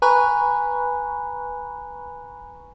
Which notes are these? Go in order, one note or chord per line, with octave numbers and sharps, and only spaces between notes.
B4 G#5 A#5 B5 C#6 F#6